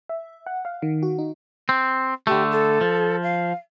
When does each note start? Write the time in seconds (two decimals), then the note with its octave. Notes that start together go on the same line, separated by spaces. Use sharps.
0.09 E5
0.46 F#5
0.65 F5
0.82 D#3
1.03 F#4
1.18 D#4
1.69 C4
2.27 D3 A3 G4
2.51 A4
2.81 F3
3.22 F5